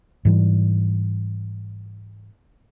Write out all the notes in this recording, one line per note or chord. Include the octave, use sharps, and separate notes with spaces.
G#2 E3 G3